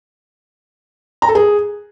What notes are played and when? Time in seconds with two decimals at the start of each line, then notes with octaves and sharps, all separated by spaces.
1.22 A#5
1.29 A4
1.35 G#4